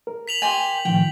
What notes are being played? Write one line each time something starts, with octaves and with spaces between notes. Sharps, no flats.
A#4
B6 F7 F#7
G4 C5 G#5
A2 D#3 F3 G5